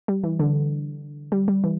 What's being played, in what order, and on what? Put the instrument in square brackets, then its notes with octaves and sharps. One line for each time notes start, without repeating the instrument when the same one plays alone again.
[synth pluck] G3
E3
D3
G3
G3
E3